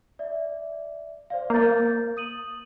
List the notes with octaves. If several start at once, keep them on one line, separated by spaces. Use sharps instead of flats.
D5 E5
C5 D5 F5
A#3 A#4 G6 A6
D#6 D#7 F#7